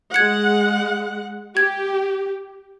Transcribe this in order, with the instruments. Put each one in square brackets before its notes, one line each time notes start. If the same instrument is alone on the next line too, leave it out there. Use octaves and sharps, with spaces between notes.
[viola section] G#3 F#5 [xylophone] G#6 C#7
[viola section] G4 [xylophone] G#6